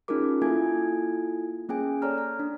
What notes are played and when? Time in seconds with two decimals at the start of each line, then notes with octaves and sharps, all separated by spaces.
0.08 C#4 D#4 F4 G#4 A#4 D6
0.42 A#3 E4 F4 A4 G#5 G#6
1.69 A#3 C#4 G#4 G5 G#5
2.02 A4 C#5 D5 A#5 F6
2.18 A#5
2.39 D4